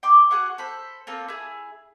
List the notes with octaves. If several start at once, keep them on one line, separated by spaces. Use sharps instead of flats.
G5 C6 D6
F#4 G#4 F#5 C#6
A4 C5 B5
A#3 C4 F4 A4
E4 G#4